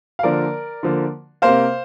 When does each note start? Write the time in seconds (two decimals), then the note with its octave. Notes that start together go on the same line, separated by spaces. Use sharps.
0.19 F5
0.23 D3 F3 A#3 A#4 D5
0.83 D3 F3 A#3
1.42 C3 A#3 C5 F5